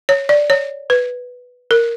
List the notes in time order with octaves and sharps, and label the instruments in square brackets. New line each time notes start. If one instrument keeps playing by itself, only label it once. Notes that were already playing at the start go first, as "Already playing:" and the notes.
[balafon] C#5
D5
C#5
B4
A#4